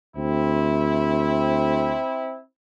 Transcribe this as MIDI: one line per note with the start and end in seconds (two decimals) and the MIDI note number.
0.16 2.00 38
0.16 2.40 60
0.16 2.40 64